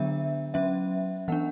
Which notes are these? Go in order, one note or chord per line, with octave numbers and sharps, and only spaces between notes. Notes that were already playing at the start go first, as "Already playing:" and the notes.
Already playing: D3 F#3 B3 D4 E5
F#3 C#4 E5
E3 B3 D4 F#5